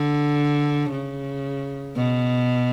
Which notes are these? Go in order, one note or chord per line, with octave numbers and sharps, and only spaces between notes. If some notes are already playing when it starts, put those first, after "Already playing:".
Already playing: D3
C#3
B2